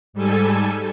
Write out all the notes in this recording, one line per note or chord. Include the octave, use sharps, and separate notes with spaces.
G#2 G3 A4 G#5